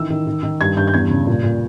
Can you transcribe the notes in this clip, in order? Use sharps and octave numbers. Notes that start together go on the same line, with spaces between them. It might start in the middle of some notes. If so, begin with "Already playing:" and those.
Already playing: D#3 E3 E6
D#3
D#3
D#3
G2 G#6
G2 G6
G6
E2 G#6
C#3
A#2
A#2